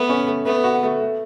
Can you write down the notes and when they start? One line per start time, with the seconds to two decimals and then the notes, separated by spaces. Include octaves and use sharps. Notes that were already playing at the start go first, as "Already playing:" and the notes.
Already playing: A3 B3
0.09 C#4
0.28 A3
0.46 A3 B3
0.64 F#4
0.83 A3
1.01 A3